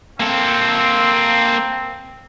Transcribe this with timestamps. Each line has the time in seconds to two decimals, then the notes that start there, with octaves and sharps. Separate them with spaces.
0.20 A#3 C4 A4